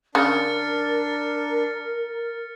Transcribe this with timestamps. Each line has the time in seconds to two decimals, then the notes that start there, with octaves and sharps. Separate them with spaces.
0.15 C#3 D4 A#4 F6 A6 C#7